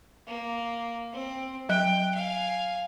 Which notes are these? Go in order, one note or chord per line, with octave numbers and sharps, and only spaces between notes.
A#3
C4
F#3 D#5 G5 F#6
F5 G#5